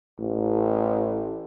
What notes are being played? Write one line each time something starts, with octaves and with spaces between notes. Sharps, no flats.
A1